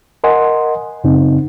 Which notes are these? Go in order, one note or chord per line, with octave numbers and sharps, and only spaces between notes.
A#4 D#5 F#5 G#5 C6
F#2 C#3 C4 D#4